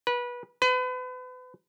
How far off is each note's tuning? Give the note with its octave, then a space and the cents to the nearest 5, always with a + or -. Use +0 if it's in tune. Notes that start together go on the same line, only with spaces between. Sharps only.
B4 -25
B4 +35